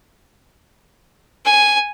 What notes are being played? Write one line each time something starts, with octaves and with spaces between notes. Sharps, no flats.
G#5